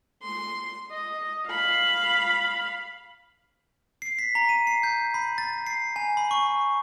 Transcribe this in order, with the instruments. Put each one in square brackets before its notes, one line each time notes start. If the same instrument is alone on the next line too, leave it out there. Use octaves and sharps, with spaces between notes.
[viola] C6
D#5
F5 B5
[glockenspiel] C7
B6
A#5
D#7
C7
G6
B5
A6
C7
G#5
B5
C#6